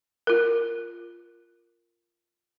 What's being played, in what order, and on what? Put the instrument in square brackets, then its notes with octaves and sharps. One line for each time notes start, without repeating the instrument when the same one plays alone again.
[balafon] F4 A#4